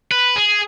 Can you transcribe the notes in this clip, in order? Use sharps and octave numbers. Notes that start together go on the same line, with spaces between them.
B4
G#4